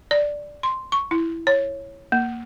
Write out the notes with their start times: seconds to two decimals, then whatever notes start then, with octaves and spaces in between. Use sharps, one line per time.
0.11 D5
0.63 C6
0.92 C#6
1.11 E4
1.47 C#5
2.12 A#3